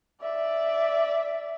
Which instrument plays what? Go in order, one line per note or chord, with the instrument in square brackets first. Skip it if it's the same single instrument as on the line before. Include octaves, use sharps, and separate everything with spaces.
[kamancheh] D5 E5